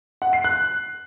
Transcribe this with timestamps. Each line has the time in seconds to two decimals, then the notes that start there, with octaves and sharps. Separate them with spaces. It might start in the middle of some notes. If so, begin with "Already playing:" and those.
0.22 F#5
0.33 C7
0.44 F#6